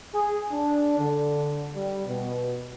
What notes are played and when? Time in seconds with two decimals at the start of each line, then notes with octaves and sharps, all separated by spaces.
0.14 G#4
0.52 D4
0.98 D3
1.74 G3
2.06 B2